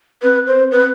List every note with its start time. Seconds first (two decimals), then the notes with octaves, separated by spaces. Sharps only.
0.22 C4 B4
0.47 C5
0.72 B4